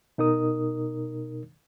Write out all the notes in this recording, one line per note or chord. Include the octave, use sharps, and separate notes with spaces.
B2 D#4 A#4 D#6